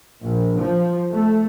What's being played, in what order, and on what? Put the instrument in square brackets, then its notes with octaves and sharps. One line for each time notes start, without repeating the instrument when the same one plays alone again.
[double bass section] A#1
F3
A3